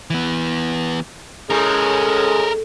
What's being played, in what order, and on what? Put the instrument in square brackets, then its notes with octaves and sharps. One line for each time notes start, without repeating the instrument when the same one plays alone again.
[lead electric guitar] E3 B3
[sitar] A2 [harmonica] G#3 C#4 [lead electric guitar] A4 A#4